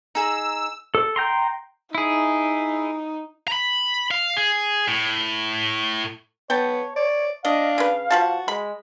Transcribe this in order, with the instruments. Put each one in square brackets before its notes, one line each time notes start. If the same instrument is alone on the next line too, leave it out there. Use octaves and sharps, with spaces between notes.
[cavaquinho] D#4 G#4 A#5 [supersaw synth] E6
[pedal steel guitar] A4
G5 A#5 C6
[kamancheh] D#4 [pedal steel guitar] E4 G#4
[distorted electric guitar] A#5 B5
F5
G#4
A2
[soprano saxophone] B3 [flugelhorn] C#5 [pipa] G5 A5
[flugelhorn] C#5 [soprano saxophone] D5
[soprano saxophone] D4 [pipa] D#5 [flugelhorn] F5
[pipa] C#3 B4
[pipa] F3 F4 A5 [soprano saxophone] F#4
[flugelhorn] G#3 [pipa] B5